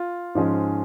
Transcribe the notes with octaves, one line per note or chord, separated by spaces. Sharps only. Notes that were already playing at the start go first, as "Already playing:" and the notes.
Already playing: F4
G#2 F3 G#3 C#4